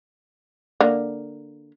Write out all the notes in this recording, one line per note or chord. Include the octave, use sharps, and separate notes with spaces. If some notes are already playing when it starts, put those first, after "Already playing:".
D3 A#3